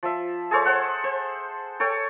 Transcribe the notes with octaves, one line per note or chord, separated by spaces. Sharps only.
F3 E5
G#4 A4 C5 C#5
C5 F#5
C5
A4 C#5 G5